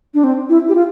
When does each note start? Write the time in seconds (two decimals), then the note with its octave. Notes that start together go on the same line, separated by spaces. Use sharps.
0.14 D4
0.24 C4
0.49 E4
0.69 G4
0.75 F4